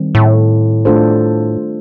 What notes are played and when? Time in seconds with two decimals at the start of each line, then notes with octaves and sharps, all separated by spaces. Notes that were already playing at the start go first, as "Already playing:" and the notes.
Already playing: D#3 G3 C4
0.15 A2
0.85 A3 D4 F4 A4 C5